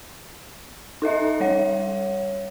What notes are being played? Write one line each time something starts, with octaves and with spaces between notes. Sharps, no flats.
D#4 A4 D#5 E5
G3 C#5 F#5